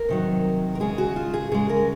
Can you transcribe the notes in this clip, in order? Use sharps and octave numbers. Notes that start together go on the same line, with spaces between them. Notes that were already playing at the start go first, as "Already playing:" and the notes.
Already playing: A#4
C3 D#3 F#3
A#4
C#3 G#3 G#4
F#4
F4
G#4
C#3 G#3 G#4
A#4